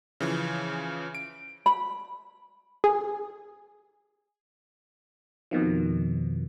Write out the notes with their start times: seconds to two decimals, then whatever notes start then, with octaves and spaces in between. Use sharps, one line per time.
0.20 C#3 E3 F3
1.15 D7
1.66 B5
2.84 G#4
5.51 F2 B2 D#3 F3